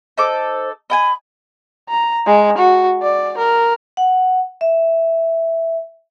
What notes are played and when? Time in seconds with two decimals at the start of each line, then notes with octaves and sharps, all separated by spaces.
0.18 D#4 A4 C5 D6
0.90 D#5 G5 G#5 B5
1.89 A#5
2.26 G#3
2.58 F#4
3.03 D5
3.38 A#4
3.97 F#5
4.61 E5